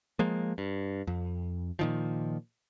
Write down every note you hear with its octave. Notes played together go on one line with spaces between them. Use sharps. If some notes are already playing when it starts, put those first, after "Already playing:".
F3 G#3 A#3
G2
F2
A#2 D#3 F3